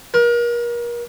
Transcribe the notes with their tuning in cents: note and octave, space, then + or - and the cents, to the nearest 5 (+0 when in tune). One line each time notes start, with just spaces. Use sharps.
A#4 +35